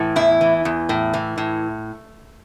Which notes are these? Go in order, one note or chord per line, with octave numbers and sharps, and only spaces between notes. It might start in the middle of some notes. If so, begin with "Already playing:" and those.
Already playing: A2 E3
E2 E4
E3
E2
A2
E3
A2